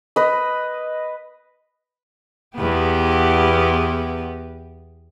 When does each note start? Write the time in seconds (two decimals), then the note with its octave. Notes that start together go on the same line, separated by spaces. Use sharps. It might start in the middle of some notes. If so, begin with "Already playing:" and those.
0.16 B4 D#5
2.57 E2 B3 G4